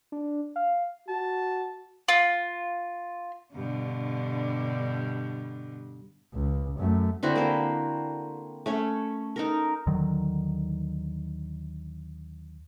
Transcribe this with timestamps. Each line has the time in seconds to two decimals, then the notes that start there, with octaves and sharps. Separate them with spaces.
0.12 D4
0.56 F5
1.08 F#4 A5
2.08 F4
3.55 G2 B2 D3
6.33 C#2
6.78 F#2 A3
7.23 D3 C4 E4 F#4
7.36 A#3 C5
8.66 A3 C#4 C#5
9.36 D#4 A4 A#4
9.87 D#2 D3 D#3 F#3